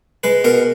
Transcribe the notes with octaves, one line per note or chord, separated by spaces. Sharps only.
G#3 B4
B2 A#4